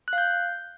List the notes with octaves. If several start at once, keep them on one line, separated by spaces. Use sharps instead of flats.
F#6
F5
G6